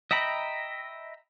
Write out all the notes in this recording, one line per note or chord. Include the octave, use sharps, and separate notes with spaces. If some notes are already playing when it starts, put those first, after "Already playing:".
D#5 E5 G5 A#5 B5